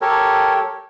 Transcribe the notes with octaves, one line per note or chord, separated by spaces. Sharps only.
G4 A4 A#4 C#5